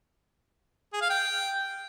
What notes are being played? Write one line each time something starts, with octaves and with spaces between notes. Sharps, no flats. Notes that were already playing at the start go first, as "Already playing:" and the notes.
G#4
F5
G5